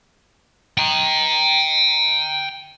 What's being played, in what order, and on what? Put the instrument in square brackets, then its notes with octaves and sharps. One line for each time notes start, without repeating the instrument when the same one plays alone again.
[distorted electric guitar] G5 A#5